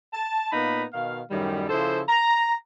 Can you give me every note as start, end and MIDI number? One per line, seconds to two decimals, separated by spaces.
0.14 0.49 81
0.52 0.84 46
0.52 0.84 58
0.52 0.84 59
0.52 0.84 63
0.52 0.84 83
0.93 1.20 47
0.93 1.20 51
0.93 1.20 77
1.31 1.65 42
1.31 1.65 45
1.31 1.65 51
1.31 1.65 55
1.69 2.01 49
1.69 2.01 53
1.69 2.01 64
1.69 2.01 69
1.69 2.01 72
2.08 2.53 82